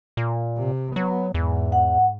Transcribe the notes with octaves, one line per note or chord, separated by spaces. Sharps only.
A#2
C3
F#3 B3
E2 G#2
F#5